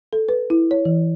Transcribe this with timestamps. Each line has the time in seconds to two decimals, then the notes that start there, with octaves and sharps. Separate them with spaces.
0.13 A4
0.29 B4
0.50 E4
0.71 C#5
0.85 E3